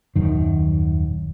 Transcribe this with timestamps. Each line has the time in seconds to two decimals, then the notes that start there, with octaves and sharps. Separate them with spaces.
0.16 D#1 F#2 D#3